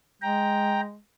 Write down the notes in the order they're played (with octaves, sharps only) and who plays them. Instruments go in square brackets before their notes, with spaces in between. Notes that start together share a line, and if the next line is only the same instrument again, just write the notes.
[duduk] G#3 [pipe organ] G5 A#5